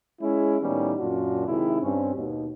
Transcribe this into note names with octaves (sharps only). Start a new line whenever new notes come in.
G#3 C#4 E4
A2 D#3 G3 A#3 B3 C#4
F#2 A#2 D4 F4 F#4
C3 D#3 G#3 E4
G2 C4 C#4
D#2 B2